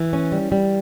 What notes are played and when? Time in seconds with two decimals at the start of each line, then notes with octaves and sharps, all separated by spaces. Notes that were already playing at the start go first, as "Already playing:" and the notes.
Already playing: E3
0.13 C#4
0.32 G3
0.52 G3